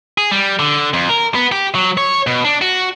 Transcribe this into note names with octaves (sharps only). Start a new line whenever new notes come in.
G#4
G3
D3
F2
A#4
B3
G4
F#3
C#5
B2
D4
F#4